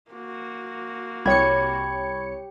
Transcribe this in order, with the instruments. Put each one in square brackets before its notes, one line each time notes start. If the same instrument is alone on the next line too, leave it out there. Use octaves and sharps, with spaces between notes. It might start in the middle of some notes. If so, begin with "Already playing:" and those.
[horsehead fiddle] A#3 F#4
[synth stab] C2 C#5 C#7 [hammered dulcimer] G4 G5 [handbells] B5 G#6